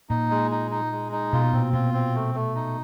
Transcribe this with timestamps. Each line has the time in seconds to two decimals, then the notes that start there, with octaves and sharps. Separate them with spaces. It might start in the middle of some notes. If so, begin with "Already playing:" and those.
0.09 A#2 D#4
0.30 G#3
0.51 D#4
0.71 D#4
0.92 G#3
1.12 D#4
1.33 B2 F4
1.53 A#2 C4
1.74 B2 F4
1.94 C4
2.15 A3
2.35 A3
2.55 D#4